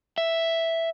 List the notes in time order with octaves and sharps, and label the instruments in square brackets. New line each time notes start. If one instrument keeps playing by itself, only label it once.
[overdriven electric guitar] E5